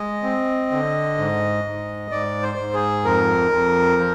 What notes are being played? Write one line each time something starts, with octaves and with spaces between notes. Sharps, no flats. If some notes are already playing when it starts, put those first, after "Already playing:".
Already playing: G#3 D#5
C4
D3
G#2
G#2
G#2 D5
C5
G#2
G#4
F2 A#4
F2
F3